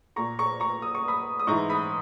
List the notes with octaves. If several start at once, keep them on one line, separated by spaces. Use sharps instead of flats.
A#2 A#5 C#6
A#5 C#6
A#5 C#6
D#6
C#6
B5 D#6
D#6
G#2 E3 A#5 C#6
B5 D#6